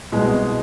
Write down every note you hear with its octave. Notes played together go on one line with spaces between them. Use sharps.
C2 B2 G#3